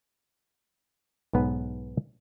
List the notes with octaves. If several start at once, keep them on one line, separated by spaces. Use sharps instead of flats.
B1 G#2 B3 B4